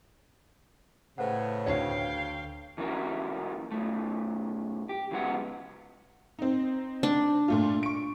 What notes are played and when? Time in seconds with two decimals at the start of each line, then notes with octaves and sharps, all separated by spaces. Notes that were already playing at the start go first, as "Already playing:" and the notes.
1.18 A2 C#3 B4 C5 F#5
1.66 D2 C#5 F5 G5
2.78 E3 F#3 A#3 C#4 F#4 A#4
3.71 B1 F2 A3
4.89 G4
5.11 C#3 F3 F#3 G#3 B3 F#5
6.39 C4 D#4
7.03 D4
7.48 A#2 A3 F4
7.83 C#6 D7